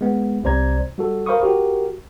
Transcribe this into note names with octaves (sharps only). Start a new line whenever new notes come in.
G#3 B3
C2 C3 C5 D5 A#5 G#6
G3 F#4 A4
A#4 C5 F5 B5 C#6 D#6
F#4 G4 A#4